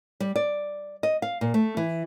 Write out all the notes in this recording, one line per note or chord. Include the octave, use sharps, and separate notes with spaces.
G3
D5
D#5
F5
A#2
A3
E3